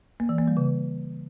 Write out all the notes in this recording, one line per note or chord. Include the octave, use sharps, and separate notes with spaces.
A#3
E3
A#3
G3
C#3